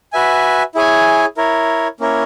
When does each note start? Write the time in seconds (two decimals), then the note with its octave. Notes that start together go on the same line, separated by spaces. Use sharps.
0.13 F#4 B4 E5 G#5
0.75 E4 G#4 C#5 G#5
1.37 E4 A#4 C#5
2.00 A#3 C#4 E4 A#4 C#5